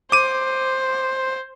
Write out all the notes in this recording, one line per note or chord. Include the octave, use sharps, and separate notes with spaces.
C5 D6 D#7